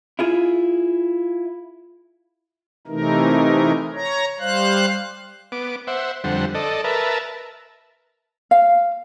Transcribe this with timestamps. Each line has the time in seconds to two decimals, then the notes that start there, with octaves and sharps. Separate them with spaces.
0.19 E4 F4 G#4
2.87 C3 E3 A3 D#4 A#4
3.94 C#5 A#5
4.39 G3 C5 F5 F#6
5.52 B3 D6
5.87 C5 E5 F#5
6.24 F2 D3 G3 C5 F#5
6.55 A4 D5 D#5
6.84 A#4 B4 E5 A5
8.51 F5